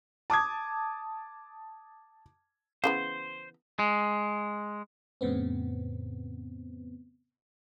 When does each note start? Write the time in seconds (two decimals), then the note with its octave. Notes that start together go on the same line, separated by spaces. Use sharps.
0.30 A5 D6 D#6 G#6
2.84 C#3 E3 B3 C5
3.79 G#3
5.21 F2 A2 C#3 B3 C4